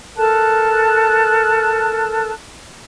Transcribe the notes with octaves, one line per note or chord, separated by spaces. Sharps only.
A4 A#4 A5 F#6